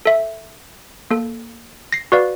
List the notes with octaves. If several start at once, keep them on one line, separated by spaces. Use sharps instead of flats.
A4 E5
A#3 A4
A#6 C7
F#4 B4 D5 F5